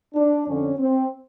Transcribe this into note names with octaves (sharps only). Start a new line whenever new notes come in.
D4
F2 D3 C#4
C4